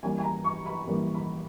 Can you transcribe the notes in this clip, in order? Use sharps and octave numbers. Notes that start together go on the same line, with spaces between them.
E3 G3 A#3 C#4 G#5
G#5
A#5
C#6
B5
E3 G3 A#3 C#4
B5